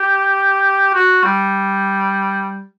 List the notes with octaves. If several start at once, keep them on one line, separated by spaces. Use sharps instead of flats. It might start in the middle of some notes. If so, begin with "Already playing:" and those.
Already playing: G4
F#4
G3